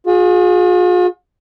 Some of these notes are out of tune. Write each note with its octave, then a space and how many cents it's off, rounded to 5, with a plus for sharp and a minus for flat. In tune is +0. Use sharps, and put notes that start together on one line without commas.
F4 +45 G#4 +0